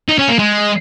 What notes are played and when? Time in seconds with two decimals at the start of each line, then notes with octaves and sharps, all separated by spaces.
0.08 D#4
0.18 C#4
0.29 A#3
0.39 G#3